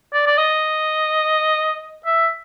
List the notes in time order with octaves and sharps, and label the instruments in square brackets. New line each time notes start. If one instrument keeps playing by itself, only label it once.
[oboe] D5
D5
D#5
E5